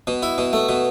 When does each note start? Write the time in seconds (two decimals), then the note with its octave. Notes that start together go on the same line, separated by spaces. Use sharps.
0.07 B2
0.23 E4
0.38 B2
0.53 A3
0.69 B2